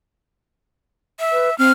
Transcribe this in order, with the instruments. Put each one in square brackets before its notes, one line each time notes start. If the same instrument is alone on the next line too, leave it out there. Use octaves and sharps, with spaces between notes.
[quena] E5
[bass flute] B4
[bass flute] C4 [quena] F6